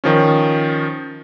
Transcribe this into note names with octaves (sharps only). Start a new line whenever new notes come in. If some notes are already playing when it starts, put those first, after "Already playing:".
D#3 F3 C#4